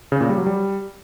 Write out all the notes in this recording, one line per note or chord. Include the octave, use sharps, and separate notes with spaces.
C#3
A#2
G3
F#3
G3